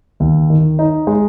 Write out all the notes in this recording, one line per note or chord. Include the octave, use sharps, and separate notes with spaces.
D#2
D#3
D#4
G#3